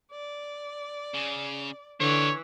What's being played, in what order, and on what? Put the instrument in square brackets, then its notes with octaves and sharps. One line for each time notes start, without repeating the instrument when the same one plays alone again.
[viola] D5
[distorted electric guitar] C#3
[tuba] D3 [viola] E3 [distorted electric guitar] D4 F4 [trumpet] C#5